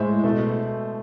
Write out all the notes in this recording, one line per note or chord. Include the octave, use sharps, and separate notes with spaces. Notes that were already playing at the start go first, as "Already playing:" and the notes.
Already playing: A2 G#3 C5 E5
B2 A3